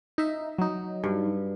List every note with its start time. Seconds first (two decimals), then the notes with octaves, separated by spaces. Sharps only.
0.18 D#4 E5
0.58 F#3 D#4
1.04 G2